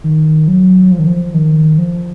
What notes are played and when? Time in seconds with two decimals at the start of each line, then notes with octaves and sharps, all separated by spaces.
0.04 D#3
0.48 F#3
0.91 F3
0.99 D#3
1.07 F3
1.34 D#3
1.78 F3